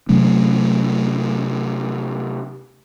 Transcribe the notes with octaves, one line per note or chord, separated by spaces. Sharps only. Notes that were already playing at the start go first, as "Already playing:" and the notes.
C3 F#3 A3 C#4